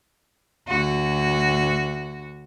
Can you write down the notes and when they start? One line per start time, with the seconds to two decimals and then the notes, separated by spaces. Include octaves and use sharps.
0.68 D2 F#4